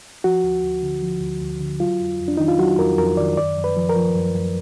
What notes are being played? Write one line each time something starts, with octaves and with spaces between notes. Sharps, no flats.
F3 F#4
D2
D2
D3
F3
D2
D2
D3
F#3 F4
F2
F2
D4
D#3 D#4
F4
F#3 F#4
F2 A#4
F2 A#4
D#3 D5
F#2 D5
F#2
B4
F3
A#4
F3
F#2
F#2